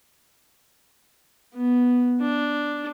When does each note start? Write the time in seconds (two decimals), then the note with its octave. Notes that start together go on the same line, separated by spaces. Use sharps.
1.56 B3
2.21 D4